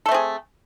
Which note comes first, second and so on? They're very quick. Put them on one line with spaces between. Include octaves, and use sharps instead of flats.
A4 A3 C4 G#4